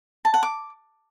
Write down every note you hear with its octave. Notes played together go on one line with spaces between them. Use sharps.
A5
F#5
D6